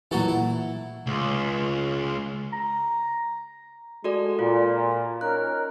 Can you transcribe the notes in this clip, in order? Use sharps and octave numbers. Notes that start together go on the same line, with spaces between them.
A#2 E3 F#3 F#4 A4
E4
C#2
A#5
G#3 F#4 A4 D5
A#2 F4
C#4 D#4 A#4 F#6